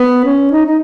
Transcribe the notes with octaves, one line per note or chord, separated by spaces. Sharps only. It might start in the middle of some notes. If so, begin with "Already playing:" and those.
Already playing: B3
C#4
D#4
D#4